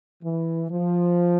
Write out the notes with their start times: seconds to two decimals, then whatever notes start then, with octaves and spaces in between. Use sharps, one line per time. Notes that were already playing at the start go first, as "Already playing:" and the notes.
0.22 E3
0.70 F3